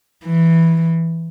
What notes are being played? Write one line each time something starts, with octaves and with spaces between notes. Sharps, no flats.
E3